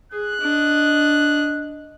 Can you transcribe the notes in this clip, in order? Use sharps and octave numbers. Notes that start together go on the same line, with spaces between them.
G#4 F#6
D4 D#5